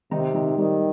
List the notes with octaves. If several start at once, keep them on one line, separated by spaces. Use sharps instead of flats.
C3 D#3 D#4
D#3 D#4
D#3 G3